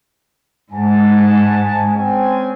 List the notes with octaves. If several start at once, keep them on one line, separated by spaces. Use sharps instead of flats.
G#2 F#5 G#5 A5
C4 C#4 G#5